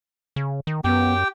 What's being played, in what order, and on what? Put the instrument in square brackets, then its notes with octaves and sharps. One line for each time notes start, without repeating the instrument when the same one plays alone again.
[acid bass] C#3
D#3
[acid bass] F#2 [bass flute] B3 [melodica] G4 G5